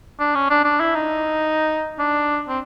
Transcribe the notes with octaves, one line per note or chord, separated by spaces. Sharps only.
D4
C#4
D4
D4
E4
D#4
D4
C4